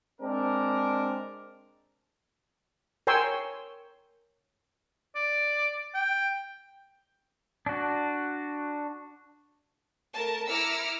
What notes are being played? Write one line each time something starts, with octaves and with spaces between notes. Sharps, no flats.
G#3 C4 D4 A#4
A#4 C#5 G5 G#5 C6 E6
D5
G5
D4 F#4
A3 A#4 A5
E4 A#5 D6 E6 F6 C#7